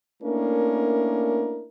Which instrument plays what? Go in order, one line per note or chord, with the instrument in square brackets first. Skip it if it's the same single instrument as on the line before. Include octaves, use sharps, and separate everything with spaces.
[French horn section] A3 A#3 C#4 D4 E4 A#4